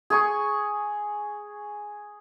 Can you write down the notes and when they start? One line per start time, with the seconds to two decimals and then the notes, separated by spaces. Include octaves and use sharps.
0.10 G#4 G#5 C#6